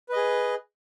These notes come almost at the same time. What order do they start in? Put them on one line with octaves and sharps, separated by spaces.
B4 D#5 G#4